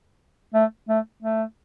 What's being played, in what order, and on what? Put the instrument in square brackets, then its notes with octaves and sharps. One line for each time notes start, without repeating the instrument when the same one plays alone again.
[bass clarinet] A3
A3
A3